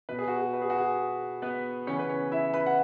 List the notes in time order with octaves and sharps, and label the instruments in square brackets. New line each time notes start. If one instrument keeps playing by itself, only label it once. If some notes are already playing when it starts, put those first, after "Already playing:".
[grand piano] B2 B3 B4
G#4
F#4
G#4
B4
G#4
F#4
G#4
B3 B4
C#3 E3 B3 C#4 C#5
B4
C#4 C#5
E4 E5
B4 B5
F#5